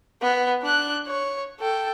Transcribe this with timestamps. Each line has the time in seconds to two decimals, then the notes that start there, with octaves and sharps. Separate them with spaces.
0.22 B3
0.62 D4 F#6
1.07 C#5
1.60 A4 G5